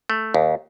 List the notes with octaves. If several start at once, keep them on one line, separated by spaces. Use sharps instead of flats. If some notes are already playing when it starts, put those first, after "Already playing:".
A3
D#2